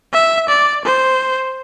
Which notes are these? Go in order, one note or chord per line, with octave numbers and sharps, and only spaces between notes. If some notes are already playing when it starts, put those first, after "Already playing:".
E5
D5
C5